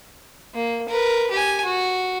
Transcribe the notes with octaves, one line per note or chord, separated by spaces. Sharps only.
A#3
A#4 B4
G4 G#5
F#4